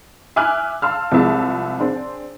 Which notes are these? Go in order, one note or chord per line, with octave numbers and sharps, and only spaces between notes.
E5 G#5 D6 F6 F#6
F5 A5 C6 E6 F6
C2 F3 G#3 E4 E5 A5
C4 D4 G#4